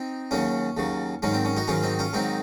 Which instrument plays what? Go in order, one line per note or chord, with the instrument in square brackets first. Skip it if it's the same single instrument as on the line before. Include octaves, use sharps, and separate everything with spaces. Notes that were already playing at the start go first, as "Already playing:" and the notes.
Already playing: [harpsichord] C4 D#4
D#2 C#3 F#3 C#4
D#2 C#3 F#3
G#2 D#3 F#3 C#4
C4
C#4
D#4 F#4
G#2 D#3 F#3 C#4 F4
C4 D#4
C#4 F4
G#2 D#3 F#3 C4 D#4